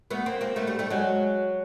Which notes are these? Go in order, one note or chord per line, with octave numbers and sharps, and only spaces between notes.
A3 B3
A#3 C4
A#3 C4
A3 B3
G3 A3
G3 A3
F#3 G#3